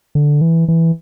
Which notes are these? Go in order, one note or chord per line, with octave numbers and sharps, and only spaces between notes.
D3
E3
E3